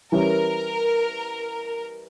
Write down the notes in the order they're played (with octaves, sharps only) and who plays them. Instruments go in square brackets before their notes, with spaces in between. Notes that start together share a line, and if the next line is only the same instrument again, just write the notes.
[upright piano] E3 G3 C#4 E4 [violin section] A#4